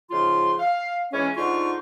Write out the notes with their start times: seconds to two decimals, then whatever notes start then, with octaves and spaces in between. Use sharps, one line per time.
0.10 G#2 C#3 F3 F4 C6
0.60 F5
1.12 E3 G#3 C#4
1.37 G#2 D3 D#4 F4 C#6